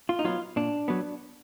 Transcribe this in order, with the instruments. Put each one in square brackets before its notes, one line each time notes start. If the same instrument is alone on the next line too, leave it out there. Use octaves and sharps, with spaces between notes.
[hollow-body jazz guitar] F4
D#4
F#3 B3 F4
A#2 D4
F#3 B3